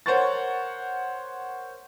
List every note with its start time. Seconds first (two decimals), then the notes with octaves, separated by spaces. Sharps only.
0.06 A#4 C5 C#5 F#5 C#6 A6